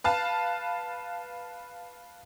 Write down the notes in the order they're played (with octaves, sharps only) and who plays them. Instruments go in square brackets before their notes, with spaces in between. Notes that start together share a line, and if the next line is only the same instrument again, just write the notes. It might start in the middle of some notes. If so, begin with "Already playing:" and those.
[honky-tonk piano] B4 F5 A5